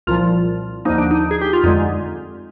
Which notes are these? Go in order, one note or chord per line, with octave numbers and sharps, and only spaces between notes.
C2 A#2 F3 F4
D#2 D3 F3 A#3 D#4
D4
D#4
G#4
G4
F4
F2 D3 G#3 D#4